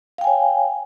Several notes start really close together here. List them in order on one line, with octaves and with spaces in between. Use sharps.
F5 G5 G#5 C#5